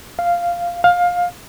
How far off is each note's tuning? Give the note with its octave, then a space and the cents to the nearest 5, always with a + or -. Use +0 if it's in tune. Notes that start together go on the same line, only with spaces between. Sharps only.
F5 -5
F5 +20